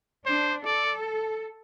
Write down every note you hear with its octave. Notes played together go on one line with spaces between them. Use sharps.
D4 C5
A4 D5